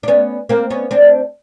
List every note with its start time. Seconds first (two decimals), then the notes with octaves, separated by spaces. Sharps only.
0.03 D4
0.08 B3 C#4
0.49 A#3 C4
0.70 B3 C#4
0.91 C4 D4